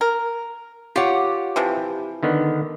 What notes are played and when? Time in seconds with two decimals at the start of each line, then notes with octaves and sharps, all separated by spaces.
0.01 A#4
0.96 F4 G4 C#5 F#5
1.56 C3 E3 F3
2.23 D3 D#3 B3